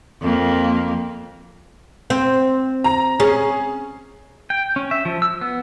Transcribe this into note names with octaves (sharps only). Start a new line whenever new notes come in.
F2 A#3
C4
A#5
C#4 G#4
G5
C#4
E5
F3
E6
B3